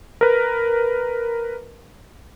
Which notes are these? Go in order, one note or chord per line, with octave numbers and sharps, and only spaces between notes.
A#4 B4